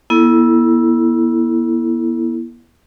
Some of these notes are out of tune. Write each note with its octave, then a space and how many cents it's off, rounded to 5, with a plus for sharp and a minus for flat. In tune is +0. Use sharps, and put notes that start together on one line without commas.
B3 -40 E4 +0 A4 +0